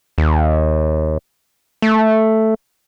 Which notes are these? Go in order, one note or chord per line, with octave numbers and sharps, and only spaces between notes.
D#2
A3